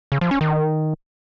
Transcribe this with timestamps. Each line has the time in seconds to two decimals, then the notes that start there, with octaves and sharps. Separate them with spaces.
0.12 C#3
0.21 F3
0.31 C#4
0.41 D#3